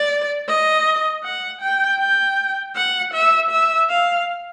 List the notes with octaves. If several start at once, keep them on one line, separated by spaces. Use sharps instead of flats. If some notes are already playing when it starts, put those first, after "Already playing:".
Already playing: D5
D#5
F#5
G5
G5
F#5
E5
E5
F5